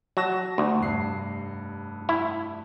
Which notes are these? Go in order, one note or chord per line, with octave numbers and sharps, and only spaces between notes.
F#3 A5 A#6 E7
D2
F1 G2 C7
E4